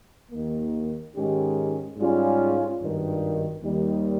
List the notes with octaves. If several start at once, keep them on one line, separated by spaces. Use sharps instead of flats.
D#2 D#3 A#3
G#2 D#3 G#3 C#4 G4
G#2 G3 C#4 F4 G#4
G#1 G2 D#3
D#2 D#3 G3